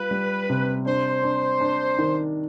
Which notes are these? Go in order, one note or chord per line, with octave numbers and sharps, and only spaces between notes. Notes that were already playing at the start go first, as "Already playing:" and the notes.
Already playing: G3 F4 B4
G3
C3
D4 C5
D4
D4
D#3